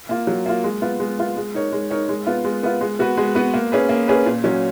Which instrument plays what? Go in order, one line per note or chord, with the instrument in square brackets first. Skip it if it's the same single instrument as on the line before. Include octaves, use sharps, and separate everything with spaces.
[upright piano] A#3 F4
F#3
A#3 F4
G#3
B3 F4
G#3
B3 F4
G#3
D#4 A#4 C#5
G#3
D#4 A#4 C#5
G#3
B3 F4
G#3
B3 F4
G#3
B3 F#4 B4
G#3
B3 F#4 B4
A#3
C#4 G#4 B4
A#3
C#4 G#4 B4
A#2
F#3 C#4